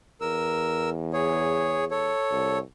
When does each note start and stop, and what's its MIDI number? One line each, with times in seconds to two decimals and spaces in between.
0.21 2.13 40
0.21 0.90 70
0.21 0.90 88
1.13 1.84 68
1.13 1.84 73
1.91 2.58 69
1.91 2.58 73
2.31 2.61 36